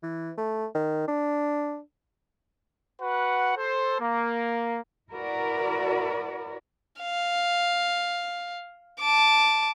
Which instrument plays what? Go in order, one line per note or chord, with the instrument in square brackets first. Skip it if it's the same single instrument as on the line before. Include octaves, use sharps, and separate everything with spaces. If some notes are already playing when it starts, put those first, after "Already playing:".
[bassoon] E3
A3
D#3
D4
[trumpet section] F#4 B4 F#5
A4 C5
A#3
[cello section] E4 F#4 A#4 B4 D5
[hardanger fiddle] F5
A5 D6